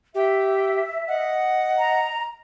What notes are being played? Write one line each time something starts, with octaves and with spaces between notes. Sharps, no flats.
G4 E5
D#5 F#5
A#5